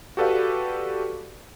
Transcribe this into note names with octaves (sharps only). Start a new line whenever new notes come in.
F#4 G4 A4 B4 D5 F5